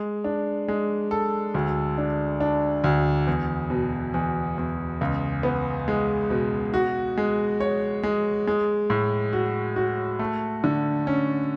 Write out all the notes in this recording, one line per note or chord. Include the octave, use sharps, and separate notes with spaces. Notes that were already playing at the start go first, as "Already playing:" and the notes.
Already playing: G#3
D4
G#3
A4
D2
D4
D4
D2
E2
B2
E2
E2
C#2
B3
G#3
B2
F#4
G#3
C#5
G#3
G#3
A2
F#4
F#4
A3
D3
C#4